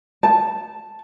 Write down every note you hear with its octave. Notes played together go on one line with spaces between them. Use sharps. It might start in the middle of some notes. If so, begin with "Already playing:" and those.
A5